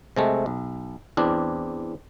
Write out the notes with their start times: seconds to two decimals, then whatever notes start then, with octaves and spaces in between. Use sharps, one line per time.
0.16 C3 G#3 A3
0.46 B1
1.17 E2 C4 D4